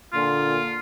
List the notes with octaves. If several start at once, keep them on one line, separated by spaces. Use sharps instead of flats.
A#2 D3 F4